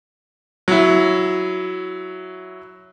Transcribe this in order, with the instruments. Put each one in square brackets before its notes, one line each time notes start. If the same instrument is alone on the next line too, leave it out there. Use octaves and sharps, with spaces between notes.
[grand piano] F#3 E4